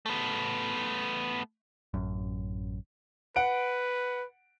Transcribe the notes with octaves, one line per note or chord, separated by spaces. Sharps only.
A3 B3
A1 F#2
B4 F#5 D7